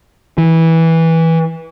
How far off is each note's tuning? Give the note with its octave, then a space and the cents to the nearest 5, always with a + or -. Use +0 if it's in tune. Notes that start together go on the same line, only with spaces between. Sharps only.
E3 -15